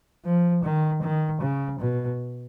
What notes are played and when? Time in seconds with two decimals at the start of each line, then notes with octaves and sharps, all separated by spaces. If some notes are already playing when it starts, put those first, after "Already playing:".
0.25 F3
0.64 D#3
1.02 D#3
1.41 C#3
1.79 B2